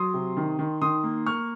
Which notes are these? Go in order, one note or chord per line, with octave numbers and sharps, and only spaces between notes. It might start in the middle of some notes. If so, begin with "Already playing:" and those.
Already playing: F#3 C6 D#6
C3
D#3
D#3
D#3 C6 D#6
A#3
A#3 C#6 F6